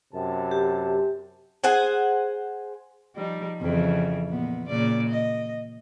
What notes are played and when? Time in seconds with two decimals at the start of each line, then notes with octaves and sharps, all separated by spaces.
0.13 F#2 C3 A5
0.51 G4
1.64 G#4 C5 F#5 G#5
3.16 F3 G3 D#4
3.62 F2 C#3 E3
4.28 A#2 B3
4.69 A#2 C#3 D5
5.09 D#5